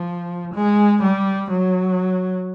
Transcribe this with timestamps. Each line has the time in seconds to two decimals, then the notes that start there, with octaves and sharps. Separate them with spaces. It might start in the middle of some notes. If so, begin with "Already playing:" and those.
Already playing: F3
0.54 G#3
1.02 G3
1.50 F#3